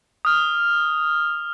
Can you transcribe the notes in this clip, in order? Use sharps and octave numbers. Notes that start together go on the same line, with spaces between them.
D#6 F6